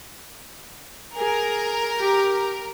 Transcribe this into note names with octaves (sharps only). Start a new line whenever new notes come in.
G#4 A#4
G4